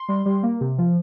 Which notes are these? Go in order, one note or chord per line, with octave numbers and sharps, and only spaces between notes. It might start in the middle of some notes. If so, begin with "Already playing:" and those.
Already playing: C6
G3
G3
A#3
C3
F3